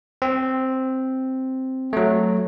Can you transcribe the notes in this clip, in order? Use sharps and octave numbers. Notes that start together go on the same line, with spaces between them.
C4
F#3 A3